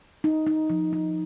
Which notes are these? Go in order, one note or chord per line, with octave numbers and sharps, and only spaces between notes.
D#4
D#4
F3
D#4